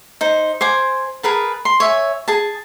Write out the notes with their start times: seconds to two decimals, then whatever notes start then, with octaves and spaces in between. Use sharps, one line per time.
0.21 D#4 C5
0.61 C5 G#5 D6
1.23 G#4 A#4 B4 A5
1.65 C6
1.80 C#5 E5 G#5
2.28 G#4 A5